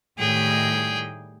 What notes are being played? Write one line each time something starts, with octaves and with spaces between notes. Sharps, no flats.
A2 D#3 G3 G#4 G5